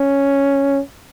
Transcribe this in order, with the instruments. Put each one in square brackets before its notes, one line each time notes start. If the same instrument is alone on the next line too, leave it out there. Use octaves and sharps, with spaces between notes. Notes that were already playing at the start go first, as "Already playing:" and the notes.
Already playing: [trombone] C#4